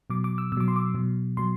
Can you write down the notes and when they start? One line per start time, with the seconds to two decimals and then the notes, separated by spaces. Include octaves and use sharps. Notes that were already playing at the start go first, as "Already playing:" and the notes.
0.10 B2 F#3 D6
0.24 D6
0.38 E6
0.52 B2 E6
0.57 F#3 D6
0.68 C6
0.76 D6
0.94 B2 F#3
1.37 B2 F#3 C6